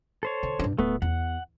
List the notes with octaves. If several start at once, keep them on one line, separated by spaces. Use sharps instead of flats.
A4 C5 C#5
D3
G2 D4
D1 A3 B3
E2 F#5